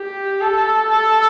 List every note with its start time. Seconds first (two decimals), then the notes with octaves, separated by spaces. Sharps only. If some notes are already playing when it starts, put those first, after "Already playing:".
Already playing: G4
0.41 A4
0.89 A4